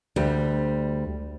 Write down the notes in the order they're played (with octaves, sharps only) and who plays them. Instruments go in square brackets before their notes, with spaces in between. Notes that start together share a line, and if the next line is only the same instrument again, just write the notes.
[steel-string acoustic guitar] D2 G3